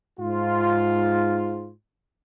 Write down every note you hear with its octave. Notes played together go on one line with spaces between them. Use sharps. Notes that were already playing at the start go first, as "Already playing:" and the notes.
G#2 F4